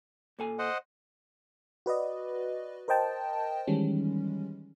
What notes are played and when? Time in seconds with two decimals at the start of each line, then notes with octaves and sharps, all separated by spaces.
0.39 A#2 A4 G#5
0.59 C5 D#5 F#5
1.86 F#4 B4 D5 D#5
2.88 A#4 C5 D#5 G5 A5
3.67 D#3 E3 G3 G#3 C#4